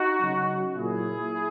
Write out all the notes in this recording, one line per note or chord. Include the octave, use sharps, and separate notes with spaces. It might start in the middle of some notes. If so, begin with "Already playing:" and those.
Already playing: D#4 F#4
C#3 F#3
A#2 F#3 E4 G#4